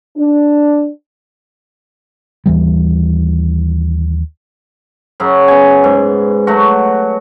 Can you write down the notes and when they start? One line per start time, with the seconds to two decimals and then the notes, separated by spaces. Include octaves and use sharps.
0.17 D4
2.46 D#2 E3 G3
5.20 F#2 C#3 F#3
5.48 B3 G#5
5.84 G#2
6.47 F#3 A3 F#4